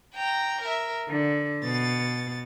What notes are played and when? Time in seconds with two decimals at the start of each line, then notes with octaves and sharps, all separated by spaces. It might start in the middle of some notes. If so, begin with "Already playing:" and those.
0.13 G5 A#5
0.62 A#4 E5
1.07 D3
1.62 B2 A6